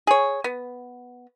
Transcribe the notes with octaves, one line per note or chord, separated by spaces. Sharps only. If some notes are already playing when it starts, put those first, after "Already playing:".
G#4 C#5
B3